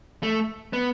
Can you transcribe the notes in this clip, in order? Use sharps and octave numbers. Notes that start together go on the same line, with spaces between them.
A3
B3